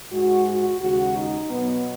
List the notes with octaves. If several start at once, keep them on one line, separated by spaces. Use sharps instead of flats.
G#2 G#3 F#4
F#4
D#2 C#3 G#3 F#4
D#4
B2 F#3 B3